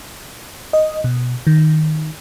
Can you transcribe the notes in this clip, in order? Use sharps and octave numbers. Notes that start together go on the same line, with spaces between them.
D#5
B2
D#3